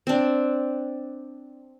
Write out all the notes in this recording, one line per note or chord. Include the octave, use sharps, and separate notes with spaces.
C4 D4